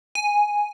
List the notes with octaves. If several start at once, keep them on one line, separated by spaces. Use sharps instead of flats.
G#5